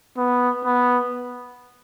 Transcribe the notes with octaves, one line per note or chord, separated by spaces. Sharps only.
B3
B3